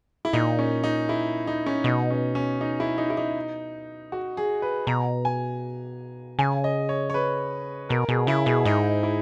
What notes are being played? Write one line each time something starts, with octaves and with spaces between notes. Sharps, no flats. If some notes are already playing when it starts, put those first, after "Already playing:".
E4
A#2 D#4
C#4
D#4
E4
D#4
C#4
B2 D#4
C#4
C#4
D#4
E4
D#4
E4
D#4
F#4
G#4
B4
B2 A#5
G#5
C#3 G#5
D#5
C#5
C#5
B4
B2 A#4
B2 G#4
C#3 E4
B2 G#4
G#2 D#4
E4